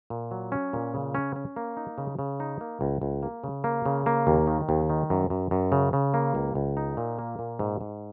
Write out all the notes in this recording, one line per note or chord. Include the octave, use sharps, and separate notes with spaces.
A#2
F#3
C#4
A#2
C#3
C#4
C#4
A#3
D#4
C#3
C#3
D#4
A#3
C#2
C#2
A#3
C#3
A#3
C#3
A#3
D#2
D#3
D#2
D#3
F#2
F#2
F#2
C#3
C#3
A#3
C#2
C#2
D#4
A#2
A#3
A#2
G#2
G#2